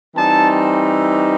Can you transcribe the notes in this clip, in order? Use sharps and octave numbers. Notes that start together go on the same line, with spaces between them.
E3 G3 C4 D#4 A5